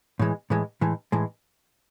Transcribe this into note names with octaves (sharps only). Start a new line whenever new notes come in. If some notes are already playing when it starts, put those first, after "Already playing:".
A2 E3 G#3
A2 E3 G#3
A2 E3 G#3
A2 E3 G#3